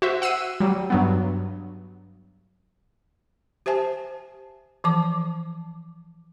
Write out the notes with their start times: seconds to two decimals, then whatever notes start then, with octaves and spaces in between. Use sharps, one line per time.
0.02 F#4 C5 E5
0.22 F#5 E6 C7 D#7
0.60 F#3 G3
0.90 G2 F#3 B3
3.66 G4 C5 E5 G#5 A5
4.84 E3 F3 A5 D6